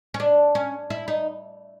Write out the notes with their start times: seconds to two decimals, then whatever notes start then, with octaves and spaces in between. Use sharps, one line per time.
0.14 C#4
0.20 D4
0.55 C#4
0.90 E4
1.08 D#4